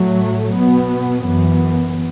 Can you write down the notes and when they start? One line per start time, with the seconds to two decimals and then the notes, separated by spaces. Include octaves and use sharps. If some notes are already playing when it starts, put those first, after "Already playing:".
Already playing: A2 F#3 A3
0.54 B2 B3
1.23 F#2 E3 B3